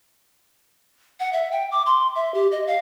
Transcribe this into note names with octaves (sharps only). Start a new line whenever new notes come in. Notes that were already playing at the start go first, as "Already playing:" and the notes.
F#5
E5
G5
D6
C6
E5
G4
D#5
F5